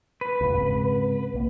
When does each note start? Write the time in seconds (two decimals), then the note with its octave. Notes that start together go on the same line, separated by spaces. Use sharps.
0.21 B4
0.41 E1 C#2
0.53 G#2 C#3 C4
1.34 B1 A#3